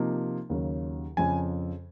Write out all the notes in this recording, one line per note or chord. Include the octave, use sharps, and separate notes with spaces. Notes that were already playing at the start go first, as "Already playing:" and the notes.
Already playing: C3 F3 A#3 D#4
D#2 C#3 F#3
F2 C#3 F3 G#5